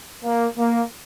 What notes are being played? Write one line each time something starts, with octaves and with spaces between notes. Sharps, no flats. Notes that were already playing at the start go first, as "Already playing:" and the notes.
A#3
A#3